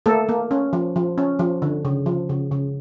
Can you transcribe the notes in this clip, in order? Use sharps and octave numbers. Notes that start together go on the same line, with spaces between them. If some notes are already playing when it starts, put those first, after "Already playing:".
A3 A#3 A4
A#3
C#4
F3
F3
C#4
F3
D3
C#3
F3
C#3
C#3